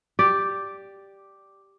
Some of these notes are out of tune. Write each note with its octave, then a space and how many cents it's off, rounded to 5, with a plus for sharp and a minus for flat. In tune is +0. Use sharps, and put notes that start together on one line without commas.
G4 +0 D5 +0